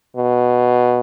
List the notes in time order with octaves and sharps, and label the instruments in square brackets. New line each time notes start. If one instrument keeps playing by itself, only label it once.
[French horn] B2